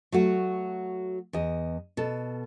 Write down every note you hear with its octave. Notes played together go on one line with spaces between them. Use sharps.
F#3 A3 F#4
E2 D#5
B2 A4